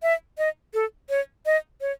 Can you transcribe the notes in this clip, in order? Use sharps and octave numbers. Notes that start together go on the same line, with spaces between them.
E5
D#5
A4
C#5
D#5
C#5